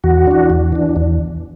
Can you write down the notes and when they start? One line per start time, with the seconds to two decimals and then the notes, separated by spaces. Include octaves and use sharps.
0.04 E2 F#4
0.27 E3 D4
0.50 E2
0.72 E3 D4
0.96 E2